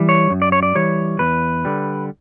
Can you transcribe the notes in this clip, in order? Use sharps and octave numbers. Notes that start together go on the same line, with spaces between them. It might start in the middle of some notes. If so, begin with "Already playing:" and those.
Already playing: E3 G3
C#5
F#2
D5
C#5
D5
E3 G3 C#5
E2 B4
D3 G3